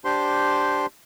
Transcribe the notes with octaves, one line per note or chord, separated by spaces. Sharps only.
D4 G4 C5 C6